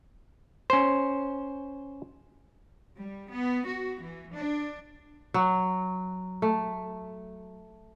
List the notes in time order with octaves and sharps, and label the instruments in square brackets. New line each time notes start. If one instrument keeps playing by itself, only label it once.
[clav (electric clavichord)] C#4 C5
[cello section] G3
B3
F#4
E3
D4
[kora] F#3
A3